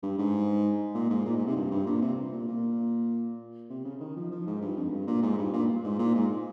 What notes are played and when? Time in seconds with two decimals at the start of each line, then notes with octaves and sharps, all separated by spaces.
0.03 G2
0.18 G#2
0.95 A#2
1.10 G#2
1.25 A#2
1.36 G#2
1.45 C3
1.56 G2
1.71 G2
1.86 A#2
2.02 C3
2.32 A#2
2.48 A#2
3.70 C3
3.85 C#3
4.01 D#3
4.16 F3
4.31 F3
4.47 G#2
4.62 G2
4.77 F2
4.92 G2
5.07 A#2
5.23 G#2
5.38 G2
5.53 A#2
5.84 G#2
5.99 A#2
6.15 G#2